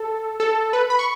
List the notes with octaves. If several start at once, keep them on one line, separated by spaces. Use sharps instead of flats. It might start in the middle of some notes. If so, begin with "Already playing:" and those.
Already playing: A4
A4
B4
B5
C#6